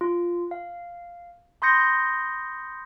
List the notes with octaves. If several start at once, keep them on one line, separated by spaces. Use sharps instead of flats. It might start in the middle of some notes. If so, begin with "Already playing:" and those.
F4
F5
B5 C6 D#6 G6 A#6 C#7